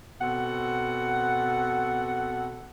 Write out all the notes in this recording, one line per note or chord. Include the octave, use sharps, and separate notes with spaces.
B2 C4 A4 F#5